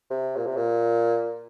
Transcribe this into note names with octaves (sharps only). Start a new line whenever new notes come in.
C3
A#2
C3
A#2